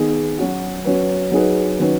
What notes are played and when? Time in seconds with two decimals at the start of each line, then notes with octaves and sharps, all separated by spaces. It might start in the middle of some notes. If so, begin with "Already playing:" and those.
Already playing: D#3 B3 G#4
0.39 F#3 C#4 F#4
0.85 F#3 C#4 B4
1.32 F#3 D#4 G#4 B4
1.79 D#3 F#3 C#4 B4